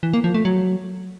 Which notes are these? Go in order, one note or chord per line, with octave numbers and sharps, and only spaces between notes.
E3
A#3
F3
A3
F#3